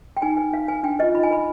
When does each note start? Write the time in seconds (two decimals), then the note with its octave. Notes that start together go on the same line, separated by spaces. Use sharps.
0.17 G5
0.22 D#4 G#5
0.37 B4 G#5
0.53 D#4 F5
0.68 B4 G#5
0.83 D4 G5
0.99 B4 D#5
1.02 F4
1.14 D#4 B5
1.23 G#5
1.31 B4 B5